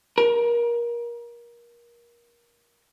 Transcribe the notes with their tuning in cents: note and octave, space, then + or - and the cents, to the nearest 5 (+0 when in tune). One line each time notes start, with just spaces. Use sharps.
A#4 +25